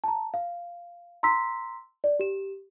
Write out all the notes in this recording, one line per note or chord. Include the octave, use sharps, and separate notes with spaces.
A5 A#5
F5
A#5 C6 E6 B6
D5
G4 E7